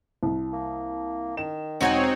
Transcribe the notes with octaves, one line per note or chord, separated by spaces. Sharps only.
C2
A#3
D#3 E7
E1 C4 D#4 F#4 C#5 F#5 G#5